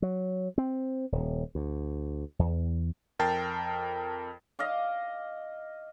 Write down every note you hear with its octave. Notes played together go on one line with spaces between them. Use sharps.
F#3
C4
D#1
D2
E2
F2 A#4 G5 A5 A6 C7
D#5 F5 D6